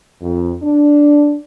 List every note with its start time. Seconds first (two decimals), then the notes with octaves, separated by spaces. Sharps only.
0.21 F2
0.63 D4